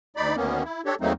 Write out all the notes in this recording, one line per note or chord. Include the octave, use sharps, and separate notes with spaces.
D2 D#4 D5 B5
D2 D#3 A#3 B3 C#4
E4
D4 G4 A4 C#5
E2 F#3 A3 A#3 C4 D#4